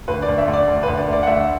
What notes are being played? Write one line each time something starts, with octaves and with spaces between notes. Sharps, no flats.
D2 B4
D5
D2
E5
D2
D5
D2
B4
D2
D5
A3
D5
F#5
D2 E5